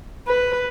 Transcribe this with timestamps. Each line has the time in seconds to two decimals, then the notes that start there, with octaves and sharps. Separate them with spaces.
0.27 B4